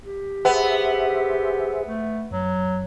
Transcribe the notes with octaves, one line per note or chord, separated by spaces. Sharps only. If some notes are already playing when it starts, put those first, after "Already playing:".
G4
B3 G#4 C5 E5
A3
F#2 F#3